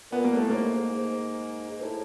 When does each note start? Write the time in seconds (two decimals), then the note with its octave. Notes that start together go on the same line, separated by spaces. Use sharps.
0.11 A#2 B3
0.24 A#3
0.33 A2 A3
0.50 G#2 A#3
0.76 G#2
0.98 G#2
1.71 G#2
1.82 A2